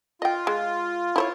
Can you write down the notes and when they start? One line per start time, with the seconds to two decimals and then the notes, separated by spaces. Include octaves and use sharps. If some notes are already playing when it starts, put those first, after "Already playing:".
0.22 F4 D#5 G5
0.47 G#3
1.16 E4 C5 C#5